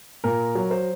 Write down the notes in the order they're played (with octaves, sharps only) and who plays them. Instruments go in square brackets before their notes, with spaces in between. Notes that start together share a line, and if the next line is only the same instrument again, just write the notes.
[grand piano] A#2 A#4
F#3
C5